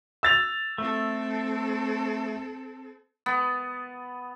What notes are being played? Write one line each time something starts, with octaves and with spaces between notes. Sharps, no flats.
E6 A6 F7
A3 C4 A4
B3